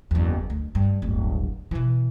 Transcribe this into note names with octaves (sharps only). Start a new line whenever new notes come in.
F#1 E2
D2
G2
D1 G1
B2 E3